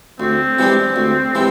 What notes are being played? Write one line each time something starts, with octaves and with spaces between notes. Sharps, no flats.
D2 C4
C3 E3 G#3 D4
D2
C3 E3 G#3